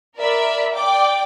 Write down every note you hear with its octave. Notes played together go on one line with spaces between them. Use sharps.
A#4 D5 E5 B5
D5 G5 D6